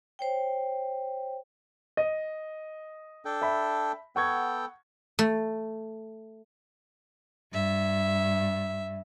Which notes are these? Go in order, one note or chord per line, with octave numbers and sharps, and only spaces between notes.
C5 C#5 G5
D#5
D4 A4 G5
E5 B5
B3 A4 F#5 G5 C#6 G#6
A3
G2 E5